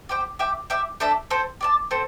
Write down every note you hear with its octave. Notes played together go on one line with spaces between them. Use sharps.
G4 C5 G5
G4 E5 G5
G4 E5 G5
A3 D4 A4 E5
C4 A4 C5
G4 D5 A5
C4 A4 C5